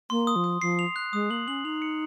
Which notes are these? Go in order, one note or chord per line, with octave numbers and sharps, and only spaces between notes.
A#3 C6
D#6
F3
D#6
F3 C7
F7
F#6
G#3 D#6
A#3 F#7
C#4 F#7
D#4 F7
C#7